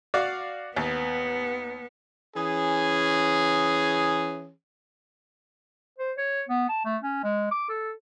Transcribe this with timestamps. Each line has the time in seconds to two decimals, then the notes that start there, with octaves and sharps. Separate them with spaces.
0.14 F#4 D5 F5
0.76 D#2 B3
2.36 E3 C#4 G#4
5.98 C5
6.18 C#5
6.48 B3
6.69 A5
6.85 A3
7.02 C#4
7.23 G#3
7.51 D6
7.69 A4